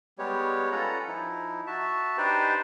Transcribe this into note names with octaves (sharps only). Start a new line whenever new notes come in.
G3 G#3 B3 G4 C#5
C#4 F4 A4 B4 F#5 A#5
F3 D#4 E4
F#4 E5 A5
D4 D#4 G4 B4 C5 D5